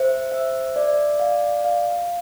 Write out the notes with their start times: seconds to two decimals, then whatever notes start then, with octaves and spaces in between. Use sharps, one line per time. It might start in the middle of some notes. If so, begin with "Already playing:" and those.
Already playing: C5 E5
0.32 E5
0.76 D5
1.20 F5
1.64 F5